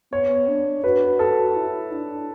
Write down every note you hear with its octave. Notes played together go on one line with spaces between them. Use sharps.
B3 C#5
D4
F#4 B4
A4
E4
D4